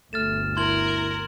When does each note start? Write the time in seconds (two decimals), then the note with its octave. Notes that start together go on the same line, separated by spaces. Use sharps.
0.13 G1 D2 A3 F6 A6 E7
0.57 E4 A#4 C6 G#6 F#7